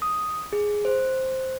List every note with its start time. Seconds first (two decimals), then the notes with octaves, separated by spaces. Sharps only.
0.02 D#6
0.53 G#4
0.85 C5